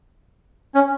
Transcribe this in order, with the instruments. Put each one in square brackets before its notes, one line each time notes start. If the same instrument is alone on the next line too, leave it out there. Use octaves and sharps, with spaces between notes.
[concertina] C#4